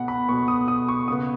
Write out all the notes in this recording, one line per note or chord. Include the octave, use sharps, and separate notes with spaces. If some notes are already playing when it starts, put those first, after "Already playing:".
Already playing: B2 B3 F#5
B5
B2 B3 C#6
D#6
D#6
C#6
C#3 B3 D#6